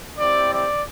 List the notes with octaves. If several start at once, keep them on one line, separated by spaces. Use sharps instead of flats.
C4 E4 G4 D5
D5